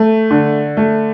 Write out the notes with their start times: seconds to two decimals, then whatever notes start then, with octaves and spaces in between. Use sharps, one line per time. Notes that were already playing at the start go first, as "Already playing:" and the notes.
Already playing: A3
0.31 D3
0.77 A3